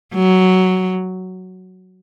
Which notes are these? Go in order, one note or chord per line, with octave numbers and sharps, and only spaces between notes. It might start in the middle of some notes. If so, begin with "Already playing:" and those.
F#3